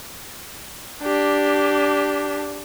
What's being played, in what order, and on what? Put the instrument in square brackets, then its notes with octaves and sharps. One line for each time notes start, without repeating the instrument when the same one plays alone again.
[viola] D4 G4